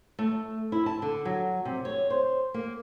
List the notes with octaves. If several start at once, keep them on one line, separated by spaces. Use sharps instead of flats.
A3
E4
A5
D3
F#3
C3
C#5
C5
A#3